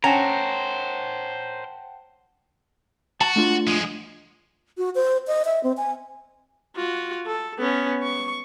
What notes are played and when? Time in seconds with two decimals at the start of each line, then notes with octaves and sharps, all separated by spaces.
0.04 C#4 A#4 C5 F#5 G5 A5 A#5
3.21 F#4 A5
3.36 A3 D4 F4
3.67 F3 G#3
4.78 F#4
4.95 C5
5.28 D#5
5.45 E5
5.64 C4
5.77 G#5
6.76 F4 F#4
7.26 A4
7.59 B3 C#4
8.03 C#6